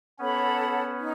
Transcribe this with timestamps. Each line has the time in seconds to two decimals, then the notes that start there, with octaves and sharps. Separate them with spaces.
0.19 B3 C#4 A4 C#5 F#5 B5
0.99 D#4